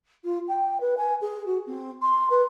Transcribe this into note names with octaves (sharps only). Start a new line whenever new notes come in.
F4
G5
B4
G#5
G#4
F#4
C4
C6
B4